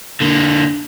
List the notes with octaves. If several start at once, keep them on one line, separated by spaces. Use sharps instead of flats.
D3 A#3